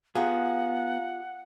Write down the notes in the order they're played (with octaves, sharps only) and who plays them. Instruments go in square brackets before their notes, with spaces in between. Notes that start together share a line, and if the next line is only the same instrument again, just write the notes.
[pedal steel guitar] B3 [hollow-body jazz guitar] F4 G4 G#4 [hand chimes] F5 G#5 A#5 [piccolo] F#5